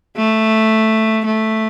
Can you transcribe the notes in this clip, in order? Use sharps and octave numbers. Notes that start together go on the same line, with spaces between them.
A3
A3